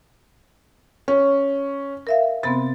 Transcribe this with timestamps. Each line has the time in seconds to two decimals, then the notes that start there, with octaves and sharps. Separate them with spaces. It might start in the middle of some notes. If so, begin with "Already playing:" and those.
1.08 C#4
2.07 A#4 E5 F5
2.43 C3 B3 C4 A6